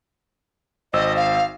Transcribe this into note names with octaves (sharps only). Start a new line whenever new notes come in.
G#1 C5 D#5 E6
F5